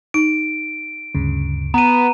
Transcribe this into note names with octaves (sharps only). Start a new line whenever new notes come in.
D#4 D7
D2 G2 C#3
B3 A#5 D#7